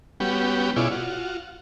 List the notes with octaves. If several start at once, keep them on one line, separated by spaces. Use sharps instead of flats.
G3 B3 C#4 F#4 G4
B2 E4 F4 G#4 C#5 D5
F4 F#4